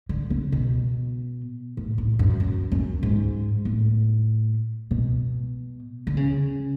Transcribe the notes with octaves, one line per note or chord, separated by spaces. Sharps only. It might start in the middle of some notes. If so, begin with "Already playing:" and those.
D3
C#3
B2
A2
A2
F#2
F#2
F#2
G#2
A2
B2
D3
C#3